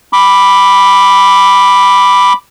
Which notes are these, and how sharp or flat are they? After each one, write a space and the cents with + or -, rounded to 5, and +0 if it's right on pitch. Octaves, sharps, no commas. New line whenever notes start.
B5 +0 D6 +0